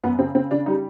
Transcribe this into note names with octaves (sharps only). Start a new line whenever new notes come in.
F#2 B3
C#3 C4
C#3 C4
C#3 D4
G3 D#4